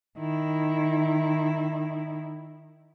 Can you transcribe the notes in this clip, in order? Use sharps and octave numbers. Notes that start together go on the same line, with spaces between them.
D#3 E4